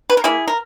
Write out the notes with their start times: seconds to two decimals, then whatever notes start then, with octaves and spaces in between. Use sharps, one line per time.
0.10 B4
0.17 A#4
0.24 A#3 E4 G#4
0.48 A#4